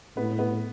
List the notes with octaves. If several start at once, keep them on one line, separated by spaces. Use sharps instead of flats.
A2 B3
B3